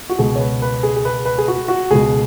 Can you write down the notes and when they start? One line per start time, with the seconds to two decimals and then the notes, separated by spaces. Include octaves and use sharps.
0.09 F#4
0.18 C#2 B2 G#4
0.36 C#5
0.40 B4
0.62 B4
0.83 G#4
0.96 G#4
1.05 B4
1.25 B4
1.38 G#4
1.48 F#4
1.68 F#4
1.91 C#2 B2 G#4